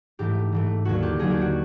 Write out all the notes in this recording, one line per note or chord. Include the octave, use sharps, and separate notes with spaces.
G#2 E3 A3 G4
G#2 E3 A3
D#2 D3 F#3 A#3 F#4
G4
D#2 D3 F#3 A#3 G#4
G4
F#4